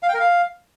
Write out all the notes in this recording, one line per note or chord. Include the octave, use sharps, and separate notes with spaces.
F5
G5
A#4
F5